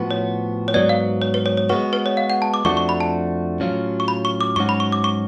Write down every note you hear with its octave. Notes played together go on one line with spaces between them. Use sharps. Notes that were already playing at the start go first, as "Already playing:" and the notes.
Already playing: A2 F3 B3 F#4
C#5
C#5
G#2 F#3 B3 D5
F5
C#5
B4
C#5
C#5
G#3 B3 F#4 B4
B4
C#5
F5
F#5
A5
D6
F2 F3 A3 D4 F#4 C#6
C#6
B5
A5
A2 F#3 C#4 F4
C#6
B5
C#6
D6
G#2 F#3 C#4 F#4 C#6
B5
C#6
D6
C#6